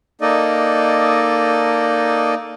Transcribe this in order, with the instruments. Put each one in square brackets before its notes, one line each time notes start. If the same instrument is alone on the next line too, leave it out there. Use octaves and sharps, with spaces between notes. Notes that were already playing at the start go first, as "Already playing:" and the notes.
[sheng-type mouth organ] A#3 D#4 A4 D5 D#5